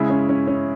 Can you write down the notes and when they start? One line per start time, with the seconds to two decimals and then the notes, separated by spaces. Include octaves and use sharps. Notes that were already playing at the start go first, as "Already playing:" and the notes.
Already playing: C#3 G#3 E4 G#4 E5
0.10 C#4
0.29 C#4
0.47 C#4